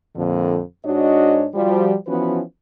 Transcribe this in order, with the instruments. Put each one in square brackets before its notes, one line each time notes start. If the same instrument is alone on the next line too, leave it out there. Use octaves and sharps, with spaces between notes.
[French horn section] F2 A#2 D3
G#2 D4 F#4 C#5 D#5
F3 G3 F#4
E3 F3 B3 C#4 F#4 B4